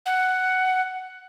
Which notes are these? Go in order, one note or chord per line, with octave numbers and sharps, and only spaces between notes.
F#5